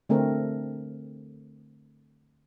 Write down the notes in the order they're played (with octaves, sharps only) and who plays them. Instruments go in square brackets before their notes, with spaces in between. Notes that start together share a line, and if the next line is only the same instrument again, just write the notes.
[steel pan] D3 A3 C4 A#4